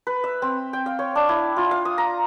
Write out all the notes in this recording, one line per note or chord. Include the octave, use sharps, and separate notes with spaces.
B4
E5
C4
G5
F5
C#5
D4
E4
F4
F5
D#6
A#5